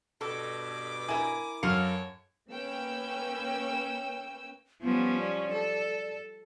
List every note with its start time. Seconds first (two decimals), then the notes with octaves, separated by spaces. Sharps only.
0.21 G2 B2 A4 D6
1.09 E4 A#4 G#5
1.63 F#2 F#3 A4 A#4 C#5 F5 C#7
2.50 A#3 C#4 B4 G5 E6
4.82 F3 G3 B3 C#4
5.20 D5
5.53 A4